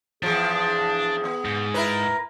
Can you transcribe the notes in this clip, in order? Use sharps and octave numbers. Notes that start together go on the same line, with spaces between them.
E2 F3 D4 G#4
B3
G#2
E4 A#4 B4